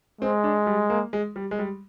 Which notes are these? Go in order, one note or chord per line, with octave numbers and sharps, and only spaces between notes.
G#3 C4
D4
G3
A#3
G#3
G3
G#3
G3